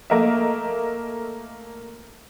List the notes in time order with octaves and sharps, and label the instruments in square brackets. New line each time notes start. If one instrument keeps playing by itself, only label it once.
[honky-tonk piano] A3 A#3 A#4 D#5 E5